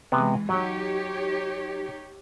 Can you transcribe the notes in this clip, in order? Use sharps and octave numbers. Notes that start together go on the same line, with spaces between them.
C3 E3 G#3 B3
F#3 D#4 G4 C#5